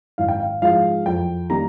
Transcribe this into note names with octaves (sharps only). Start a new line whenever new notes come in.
G#1 F5
G5
F5
G#2 F3 G#3 F5
F2 G5
D#3 G3 A#3 A#5